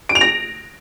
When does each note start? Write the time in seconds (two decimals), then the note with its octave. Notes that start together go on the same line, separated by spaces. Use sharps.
0.09 D7
0.15 F7
0.21 A#6